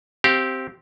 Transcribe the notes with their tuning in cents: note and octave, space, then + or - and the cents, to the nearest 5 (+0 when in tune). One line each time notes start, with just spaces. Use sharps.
C4 +0 G4 -15 F5 +0